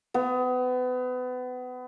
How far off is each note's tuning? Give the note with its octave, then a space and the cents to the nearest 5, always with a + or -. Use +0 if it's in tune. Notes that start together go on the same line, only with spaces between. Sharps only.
B3 +30